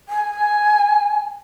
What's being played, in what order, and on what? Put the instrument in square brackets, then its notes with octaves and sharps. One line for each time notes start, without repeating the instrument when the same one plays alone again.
[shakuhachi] G#5